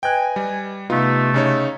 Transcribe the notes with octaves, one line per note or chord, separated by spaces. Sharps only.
B4 D#5 G5 G#5 F#6
G3
C3 A3 B3 D#4 F4
C#3 D#4 C#5